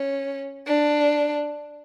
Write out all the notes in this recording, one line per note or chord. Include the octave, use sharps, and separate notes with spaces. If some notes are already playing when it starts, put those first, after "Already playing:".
Already playing: C#4
D4